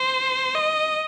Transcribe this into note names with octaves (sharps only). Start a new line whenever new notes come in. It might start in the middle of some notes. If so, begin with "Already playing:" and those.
Already playing: C5
D#5